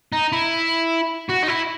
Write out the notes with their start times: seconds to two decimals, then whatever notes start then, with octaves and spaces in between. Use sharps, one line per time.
0.13 D#4
0.32 E4
1.30 F#4
1.43 D#4
1.48 E4